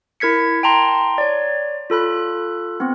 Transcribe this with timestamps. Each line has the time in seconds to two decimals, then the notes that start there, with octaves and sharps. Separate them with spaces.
0.20 E4 A#4 G#6 B6 C#7
0.63 G5 A5 A#5 C6
1.18 C#5 D5
1.90 F4 A4 B5 F#6
2.80 B3 C4